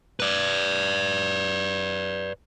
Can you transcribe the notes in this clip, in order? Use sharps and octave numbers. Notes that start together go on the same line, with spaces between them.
B4 D5